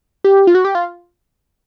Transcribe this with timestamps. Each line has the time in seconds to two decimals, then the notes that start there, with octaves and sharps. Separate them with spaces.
0.24 G4
0.47 F4
0.55 F#4
0.65 G4
0.75 F4